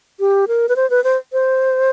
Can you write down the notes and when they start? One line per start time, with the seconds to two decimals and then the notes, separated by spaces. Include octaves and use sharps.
0.20 G4
0.48 A#4
0.69 B4
0.76 C5
0.90 B4
1.04 C5
1.33 C5